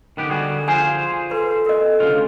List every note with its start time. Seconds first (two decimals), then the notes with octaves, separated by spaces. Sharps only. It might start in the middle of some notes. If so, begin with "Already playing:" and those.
0.17 D3 D#3 B3 G4
0.30 G3 F#4 G#4
0.68 F4 G#4 C5 G#5
1.31 A4 B4 C6
1.66 A4 A#4 D#5
2.00 D2 C#3 F4